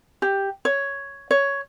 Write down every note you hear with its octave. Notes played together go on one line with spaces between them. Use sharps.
G4
C#5
C#5